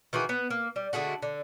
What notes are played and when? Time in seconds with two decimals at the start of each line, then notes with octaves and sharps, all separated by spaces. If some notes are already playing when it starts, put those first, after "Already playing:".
0.13 D#3 E3 F#4 G#4
0.29 B3
0.50 A#3
0.76 G3
0.93 D3 G#3 A3 F#4
1.22 D3